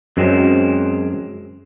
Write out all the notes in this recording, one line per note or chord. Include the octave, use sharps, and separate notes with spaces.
F#2 F#3 G#3 C4